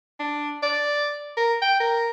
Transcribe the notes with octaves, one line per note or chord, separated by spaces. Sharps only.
D4
D5
A#4
G5
A#4